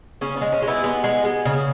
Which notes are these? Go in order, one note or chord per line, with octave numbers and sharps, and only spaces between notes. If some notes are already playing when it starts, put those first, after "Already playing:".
C#3 C#4
G#3 B3
C#4
G#3
B3 E4
G#3 B3
G#3
G#3
C#3